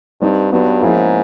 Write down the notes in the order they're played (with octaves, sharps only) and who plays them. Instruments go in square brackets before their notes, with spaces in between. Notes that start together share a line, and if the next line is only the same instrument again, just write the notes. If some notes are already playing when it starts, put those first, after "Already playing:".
[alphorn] G2 [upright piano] G3 C4 D#4
[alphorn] G2 [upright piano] F#3 B3 D#4 F#4
[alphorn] G#2 [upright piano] F3 A#3 C#4 E4 G#4